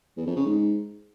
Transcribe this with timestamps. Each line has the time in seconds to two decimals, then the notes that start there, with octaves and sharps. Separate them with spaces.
0.17 E2
0.27 F2
0.36 C#3
0.46 G#2